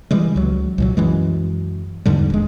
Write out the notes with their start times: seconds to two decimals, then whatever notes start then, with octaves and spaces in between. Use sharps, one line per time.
0.11 C#3 E3 G3 G#3
0.36 C#2 F#3
0.78 C2 A#2 F#3
0.97 F#2 E3 G#3
2.06 E2 G#2 D3 G3
2.30 D#1 G#3